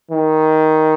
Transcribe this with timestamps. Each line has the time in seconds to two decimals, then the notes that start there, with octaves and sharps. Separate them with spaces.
0.11 D#3